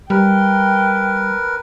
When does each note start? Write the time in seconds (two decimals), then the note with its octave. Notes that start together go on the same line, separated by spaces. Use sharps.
0.10 G3 A#4 B4 G5